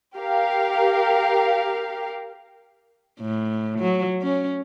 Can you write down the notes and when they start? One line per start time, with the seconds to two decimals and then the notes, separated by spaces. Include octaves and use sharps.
0.18 G4 A#4 F5
3.21 A2
3.80 F#3
4.22 C#4